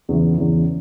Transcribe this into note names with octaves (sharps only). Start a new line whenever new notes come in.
E2 C#3 E3
E2 C#3 E3